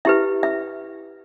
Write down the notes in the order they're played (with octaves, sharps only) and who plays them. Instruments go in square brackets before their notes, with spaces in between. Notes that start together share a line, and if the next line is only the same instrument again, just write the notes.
[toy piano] E4 G4 B4 E5
E5